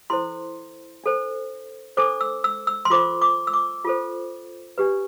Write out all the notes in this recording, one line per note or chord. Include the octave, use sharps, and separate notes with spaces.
E4 A4 C5 C6
D4 A4 C5
D4 A4 C5 D6
E6
E6
E6
C6
F4 A4 C5 D6
D6
E6
D6
F4 A4 C5
D4 G4 B4